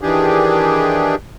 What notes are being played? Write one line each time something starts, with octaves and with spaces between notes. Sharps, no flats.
D#3 E3 D4 G4 G#4